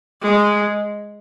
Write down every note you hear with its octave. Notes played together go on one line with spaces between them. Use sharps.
G#3